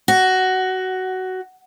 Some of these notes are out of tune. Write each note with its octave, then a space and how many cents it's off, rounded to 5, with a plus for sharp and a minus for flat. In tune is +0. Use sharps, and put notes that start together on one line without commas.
F#4 +15